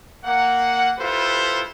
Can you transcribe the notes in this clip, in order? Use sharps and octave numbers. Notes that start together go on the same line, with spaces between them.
A#3 F#5
E4 F4 G4 A4 B4 C5